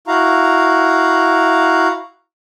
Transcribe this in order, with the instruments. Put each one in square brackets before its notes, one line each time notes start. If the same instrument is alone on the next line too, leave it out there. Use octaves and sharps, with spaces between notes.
[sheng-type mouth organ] E4 F#4 F5 A#5